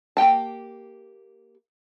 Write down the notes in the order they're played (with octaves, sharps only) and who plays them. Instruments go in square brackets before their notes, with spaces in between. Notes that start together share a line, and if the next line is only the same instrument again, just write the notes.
[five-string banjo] A#3 G4 G5 A5